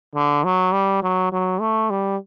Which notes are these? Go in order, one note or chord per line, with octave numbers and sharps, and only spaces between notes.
D3
F#3
G3
F#3
F#3
A3
G3